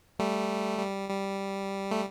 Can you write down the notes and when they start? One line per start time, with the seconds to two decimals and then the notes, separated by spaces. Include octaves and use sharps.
0.19 G3 A3
0.79 G3
1.10 G3
1.91 A3